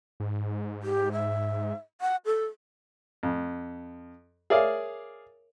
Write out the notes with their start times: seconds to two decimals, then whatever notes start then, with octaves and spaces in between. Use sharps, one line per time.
0.20 G#2
0.83 G4
1.13 E5
2.01 F#5
2.25 A4
3.23 F2
4.50 G#4 A#4 C#5 D5 E5 F5